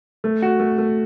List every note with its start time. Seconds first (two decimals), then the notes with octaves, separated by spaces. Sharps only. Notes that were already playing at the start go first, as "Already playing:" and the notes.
0.24 A3
0.42 F#4
0.60 A3
0.78 A3